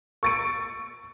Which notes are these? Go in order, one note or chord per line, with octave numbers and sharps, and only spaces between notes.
C#6 E6 A6 C#7 D7